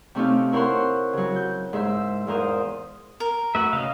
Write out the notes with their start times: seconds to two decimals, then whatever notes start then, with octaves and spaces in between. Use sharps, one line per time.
0.15 C3 A3 C4 C#4 D#4 F4
0.52 E4 A#4 C5 C#5 F#5 C6
1.13 C#3 F#3
1.36 G6
1.73 G#2 C5 E5 C6 E6
2.27 E2 G#2 F4 A#4 C5 D#6
3.20 A#4
3.55 A3 F#4 B4 E5
3.73 C#3 D#5 F5